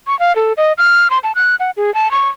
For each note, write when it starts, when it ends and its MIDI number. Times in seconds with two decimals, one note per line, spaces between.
0.07 0.18 85
0.20 0.35 77
0.36 0.53 69
0.57 0.73 75
0.78 1.08 89
1.10 1.18 84
1.24 1.32 81
1.35 1.56 90
1.60 1.71 78
1.77 1.93 68
1.94 2.11 81
2.11 2.29 85